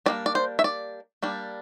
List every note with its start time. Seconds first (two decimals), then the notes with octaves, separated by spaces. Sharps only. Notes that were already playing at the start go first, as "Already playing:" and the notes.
0.06 G3 A#3 D4 D5
0.26 D5
0.35 C5
0.59 E5
0.64 D5
1.23 G3 A#3 D4